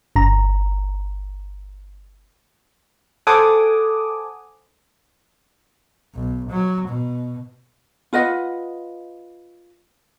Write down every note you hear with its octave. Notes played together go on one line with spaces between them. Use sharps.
G1 A#5
A4 C5 F#5 G#5 D6 D#6
B1
F#3
B2
F4 B4 D#5 F#5